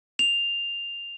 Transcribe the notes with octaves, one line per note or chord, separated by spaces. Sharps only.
F7